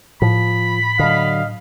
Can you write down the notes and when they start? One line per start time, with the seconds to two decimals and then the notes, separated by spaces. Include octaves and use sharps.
0.22 A2 F3 B5
0.99 D3 F#3 D#5 F5